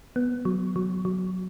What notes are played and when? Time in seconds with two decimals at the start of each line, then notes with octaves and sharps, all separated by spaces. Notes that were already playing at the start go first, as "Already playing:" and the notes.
0.16 B3
0.45 F#3
0.76 F#3
1.05 F#3